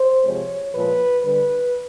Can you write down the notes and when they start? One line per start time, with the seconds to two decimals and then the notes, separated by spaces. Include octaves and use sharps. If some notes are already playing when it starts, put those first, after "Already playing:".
Already playing: C5
0.24 C3 F3 G#3 C#5
0.73 A#2 F3 G#3 B4
1.22 D3 G3 B4